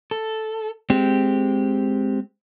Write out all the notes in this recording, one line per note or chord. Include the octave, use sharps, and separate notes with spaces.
A4
G#3 C4 G4